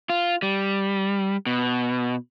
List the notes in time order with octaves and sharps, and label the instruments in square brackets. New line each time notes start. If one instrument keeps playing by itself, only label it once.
[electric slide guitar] F4
G3
B2